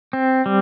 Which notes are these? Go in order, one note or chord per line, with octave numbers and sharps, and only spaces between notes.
C4
G3